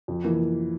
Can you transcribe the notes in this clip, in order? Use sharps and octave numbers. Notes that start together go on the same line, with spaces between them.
F2
E3 A#3